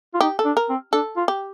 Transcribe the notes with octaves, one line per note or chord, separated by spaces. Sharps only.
F4
D#4 G4
A4
D4
A#4
C4
D4 A4
F4
G4